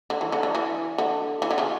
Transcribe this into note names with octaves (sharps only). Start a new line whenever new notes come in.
D3
E3
D3
D3
E3
D3
E3
D3
C#3